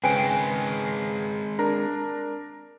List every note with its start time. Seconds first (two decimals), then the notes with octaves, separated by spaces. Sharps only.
0.04 C#3 G#3 C4 B4 G5 G#5 D7
1.59 D4 A#4 A#5